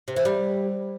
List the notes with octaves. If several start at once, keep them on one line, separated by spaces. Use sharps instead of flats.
C3
E3
G3